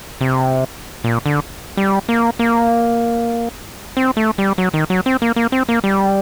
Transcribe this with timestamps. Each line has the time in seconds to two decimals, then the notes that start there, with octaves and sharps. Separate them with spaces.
0.21 C3
1.04 A#2
1.26 D3
1.77 G3
2.09 A#3
2.39 A#3
3.97 C4
4.17 A3
4.38 G3
4.58 F#3
4.74 D#3
4.90 F#3
5.06 C4
5.22 A#3
5.36 A#3
5.52 C4
5.69 A#3
5.84 G3